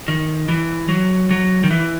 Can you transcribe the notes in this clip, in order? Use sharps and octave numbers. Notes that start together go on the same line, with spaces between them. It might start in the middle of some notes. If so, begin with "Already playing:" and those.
D#3
E3
F#3
F#3
D#3
E3